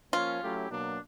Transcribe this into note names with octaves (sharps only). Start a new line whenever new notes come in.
F3 A#3 C#4 F4
F#3 A3 C#4 E4 G4
B2 F#3 A#3 D4